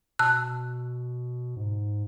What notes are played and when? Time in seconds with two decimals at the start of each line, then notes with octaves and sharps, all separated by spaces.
0.19 B2 A5 E6 F#6
1.56 G#2